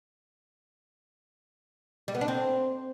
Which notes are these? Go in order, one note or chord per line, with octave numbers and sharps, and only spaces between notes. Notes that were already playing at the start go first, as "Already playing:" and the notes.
G3
B3
D4
C4